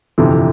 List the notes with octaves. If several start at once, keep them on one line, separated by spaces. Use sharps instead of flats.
G1 F2 C3 E3